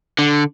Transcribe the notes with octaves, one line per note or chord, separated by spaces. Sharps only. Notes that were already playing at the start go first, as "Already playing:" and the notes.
D3